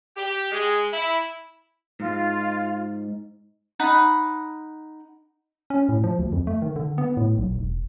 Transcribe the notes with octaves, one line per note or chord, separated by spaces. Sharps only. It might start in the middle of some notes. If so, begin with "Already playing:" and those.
G4
G#3
E4
G#2 F4
D#4 F#5 B5
C#4
A2
F3
D2
F2
A3
D#3
D3
B3
A2
B1
E1